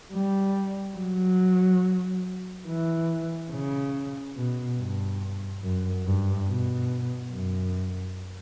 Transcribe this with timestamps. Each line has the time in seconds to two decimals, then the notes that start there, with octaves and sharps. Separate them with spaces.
0.13 G3
0.98 F#3
2.67 E3
3.52 C#3
4.36 B2
4.79 G2
5.63 F#2
6.06 G2
6.48 B2
7.32 F#2